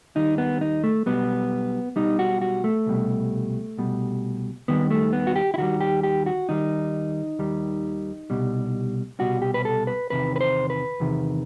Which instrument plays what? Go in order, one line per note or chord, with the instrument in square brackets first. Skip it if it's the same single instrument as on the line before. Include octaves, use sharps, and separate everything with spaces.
[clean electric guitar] D#2 D#3 G3 D#4
B3
D#4
A3
B1 B2 G3 B3
B1 B2 G3 D#4
F#4
F#4
A3
C2 B2 G3
C2 B2 G3
D#2 D#3 G3 B3
A3
B3
F#4
G4
E4
D#2 D#3 G3 F#4
G4
G4
F#4
D#2 D#3 G3 D#4
D#2 D#3 G3
C2 B2 G3
C2 B2 G3 F#4
G4
B4
A4
B4
E2 C3 D#3 B4
B4
C5
B4
E2 C3 D#3